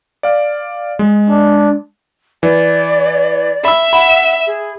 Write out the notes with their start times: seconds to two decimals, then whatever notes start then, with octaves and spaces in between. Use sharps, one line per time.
0.23 D5 F5
0.99 G#3
1.29 D4
2.43 E3 D5
3.65 E5 B5 E6
3.93 F#5 B5
4.47 G#4